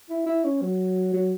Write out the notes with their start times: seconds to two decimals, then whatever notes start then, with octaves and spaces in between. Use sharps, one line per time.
0.10 E4
0.26 E4
0.44 C#4
0.62 F#3
1.13 F#3